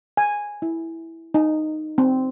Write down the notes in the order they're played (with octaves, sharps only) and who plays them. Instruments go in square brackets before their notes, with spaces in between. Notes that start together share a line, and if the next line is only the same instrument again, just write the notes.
[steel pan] G#5
E4
D#4
C4